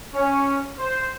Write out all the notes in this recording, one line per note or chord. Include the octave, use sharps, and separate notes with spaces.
C#4
C5